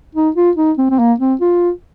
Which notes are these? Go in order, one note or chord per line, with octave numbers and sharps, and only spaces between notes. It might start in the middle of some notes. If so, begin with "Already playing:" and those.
D#4
F4
D#4
C4
C4
A#3
C4
F4